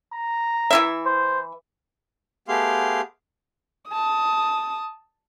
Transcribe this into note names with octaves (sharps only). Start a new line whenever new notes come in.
A#5
E3 E4 E5
C5
A3 B3 G4 G#4 F5 C6
A5 D#6